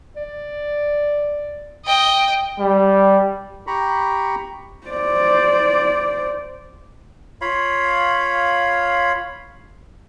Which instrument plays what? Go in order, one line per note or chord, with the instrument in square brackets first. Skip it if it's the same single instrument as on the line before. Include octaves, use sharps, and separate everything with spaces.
[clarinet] D5
[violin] D#5 G5
[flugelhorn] G3
[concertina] G4 A#5 B5 C#6
[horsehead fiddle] C5 D5
[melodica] F4 C#5 F5 B5